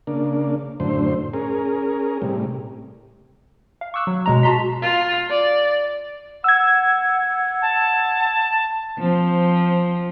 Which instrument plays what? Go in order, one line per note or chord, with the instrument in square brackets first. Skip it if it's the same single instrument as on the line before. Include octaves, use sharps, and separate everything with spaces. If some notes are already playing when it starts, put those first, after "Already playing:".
[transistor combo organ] C#3 A#3 D4
F#2 A2 D3 C5
C#4 G#4 A#4
A2 C3 G3
[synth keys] F5
C#6 D6 E6 F#6
F#3
B2 G#3 A#5
F#4 A5 A#5 C6 B6
[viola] F4
D5
[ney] F#5 [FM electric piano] E6 G#6
[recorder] A5
[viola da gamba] F3 C4